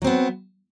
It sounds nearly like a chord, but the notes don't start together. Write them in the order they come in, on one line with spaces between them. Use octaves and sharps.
F#3 C4 B3